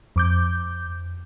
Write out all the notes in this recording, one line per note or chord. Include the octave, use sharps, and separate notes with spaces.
F2 D6 G6